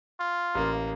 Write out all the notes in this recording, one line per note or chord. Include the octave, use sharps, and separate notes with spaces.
F4
A1 A#3